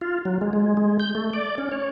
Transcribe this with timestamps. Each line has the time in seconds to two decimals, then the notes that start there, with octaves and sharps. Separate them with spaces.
0.01 F4
0.25 F#3
0.41 G#3
0.53 G#3
0.77 G#3
1.00 G6
1.15 A3
1.33 D5
1.58 C#4
1.71 C#5